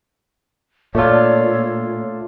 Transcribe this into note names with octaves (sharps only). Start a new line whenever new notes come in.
A#2 A3 D4 F4 A4 C#5